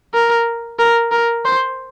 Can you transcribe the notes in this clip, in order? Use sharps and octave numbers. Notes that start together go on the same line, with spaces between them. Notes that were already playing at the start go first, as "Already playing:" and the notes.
A#4
A#4
A#4
C5